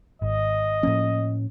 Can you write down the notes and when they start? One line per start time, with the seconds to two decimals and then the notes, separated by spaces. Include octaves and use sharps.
0.22 G#1 D#5
0.83 A2 F3 A#3 C#4